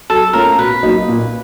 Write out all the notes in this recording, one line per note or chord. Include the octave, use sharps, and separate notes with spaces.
F#3 A4
A3 C#4 F4 A#4
B2 B4
F#3 A#3 D#4
A#2